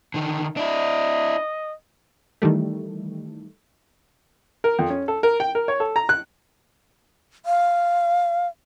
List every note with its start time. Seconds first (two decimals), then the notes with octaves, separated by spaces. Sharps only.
0.14 D3 D#3
0.57 D4 E4 D#5
2.42 D#3 E3 G3 A3
4.64 A#4
4.79 F2
4.90 C#4
5.08 A4
5.23 A#4
5.40 G5
5.55 A#4
5.68 C#5
5.80 A4
5.96 A#5
6.09 F#6
7.46 F5